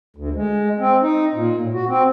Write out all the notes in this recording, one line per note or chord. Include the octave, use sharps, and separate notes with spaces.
D2
G#3
C4
D#4
A#2
A2
F#4
C4